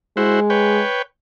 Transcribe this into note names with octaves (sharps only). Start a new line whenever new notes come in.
G#3 E4 F#4 C5
B4 C#5 G5